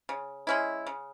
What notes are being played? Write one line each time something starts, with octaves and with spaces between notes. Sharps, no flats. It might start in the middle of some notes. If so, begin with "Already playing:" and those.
C#3
G#3 C#4 E4
C#3